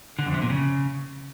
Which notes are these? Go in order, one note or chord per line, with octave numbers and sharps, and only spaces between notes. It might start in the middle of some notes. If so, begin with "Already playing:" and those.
D3
F2
C3
A#2
C#3